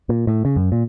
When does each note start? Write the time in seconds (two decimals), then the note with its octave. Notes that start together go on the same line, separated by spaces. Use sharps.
0.09 A#2
0.27 A2
0.45 C#3
0.56 F#2
0.72 A#2